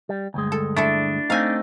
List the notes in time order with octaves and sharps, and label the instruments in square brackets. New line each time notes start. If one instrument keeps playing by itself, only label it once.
[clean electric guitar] G3
D2 G2 G#3
[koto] A4
[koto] A3 E4 A4 [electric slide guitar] D4
[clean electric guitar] A3 C4 D#4 [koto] F5 G#5